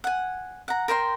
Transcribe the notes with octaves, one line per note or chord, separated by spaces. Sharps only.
F#5 G#5
F#5 A#5
A#4 C5 G5 C6